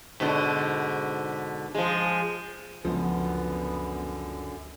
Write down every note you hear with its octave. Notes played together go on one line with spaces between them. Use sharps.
G#2 B2 D3
F3 G#3
C#2 F#2 D3 F3 B3